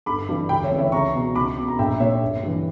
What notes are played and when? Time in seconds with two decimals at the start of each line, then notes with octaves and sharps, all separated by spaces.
0.06 G1 B5 D6
0.29 G2 E3
0.49 D2 G5 B5
0.64 C#5 E5
0.71 C#3 E3
0.78 C#5 E5
0.92 C#2 A#5 C#6
1.15 B2
1.35 C#2 B5 D6
1.57 B2
1.68 A#5
1.79 A#1 E5 G5
2.00 A#2 C#5 E5
2.21 G1
2.43 G2 E3